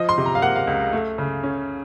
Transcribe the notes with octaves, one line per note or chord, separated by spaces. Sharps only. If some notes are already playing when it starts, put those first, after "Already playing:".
Already playing: F3 D#5
C6
C3
A#5
F5
A#3 F#5
F5
C#2
A3
C#3
C#4